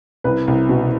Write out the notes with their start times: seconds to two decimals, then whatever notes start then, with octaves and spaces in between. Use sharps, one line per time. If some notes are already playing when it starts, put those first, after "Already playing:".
0.24 C2 B4
0.48 C2
0.69 B2